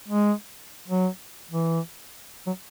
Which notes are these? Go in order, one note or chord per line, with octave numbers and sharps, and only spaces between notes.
G#3
F#3
E3
F#3